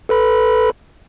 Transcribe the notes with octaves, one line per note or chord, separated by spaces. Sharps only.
A4 B4 B5